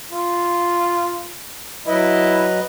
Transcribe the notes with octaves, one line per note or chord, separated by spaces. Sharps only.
F4
F#3 E4 B4 D#5